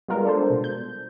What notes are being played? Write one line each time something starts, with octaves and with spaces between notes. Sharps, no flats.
G3 G#3 B3 F4 A#4
D4 A4 C5
B2
G6